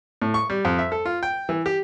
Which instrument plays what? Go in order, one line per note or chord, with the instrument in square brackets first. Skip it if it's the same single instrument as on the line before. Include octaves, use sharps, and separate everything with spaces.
[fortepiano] A2
C#6
G3
F2
E5
A4
F4
G5
E3
G4